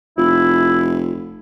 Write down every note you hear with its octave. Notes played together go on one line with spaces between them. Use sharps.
F1 E4 F4